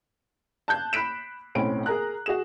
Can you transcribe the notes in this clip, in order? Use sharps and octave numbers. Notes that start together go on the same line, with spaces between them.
A5 F#6 G6
B5 F#6 B6 D7 E7
B1 A2 C4 C#4 B5 D7
G#4 A#4 A#5 F#6
F#4 G#4 E7